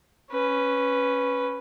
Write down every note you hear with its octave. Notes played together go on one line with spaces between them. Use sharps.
C#4 B4